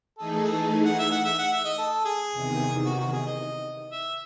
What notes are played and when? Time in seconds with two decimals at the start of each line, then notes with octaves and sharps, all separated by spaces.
0.18 E3 A3 D#4 G#4 A4
0.45 A4
0.85 F#5
0.99 E5
1.11 F#5
1.25 E5
1.39 F#5
1.52 E5
1.65 D#5
1.78 A4
2.05 G#4
2.32 E2 C3 D#3
2.85 F#4
2.99 F#4
3.12 G#4
3.26 D#5
3.91 E5